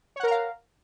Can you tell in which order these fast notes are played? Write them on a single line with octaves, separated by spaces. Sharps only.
C#5 F#5 A#4 A#5 F5